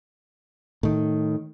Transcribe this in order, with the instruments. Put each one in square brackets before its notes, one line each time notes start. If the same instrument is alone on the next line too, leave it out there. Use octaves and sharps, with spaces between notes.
[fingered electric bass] A2 D#3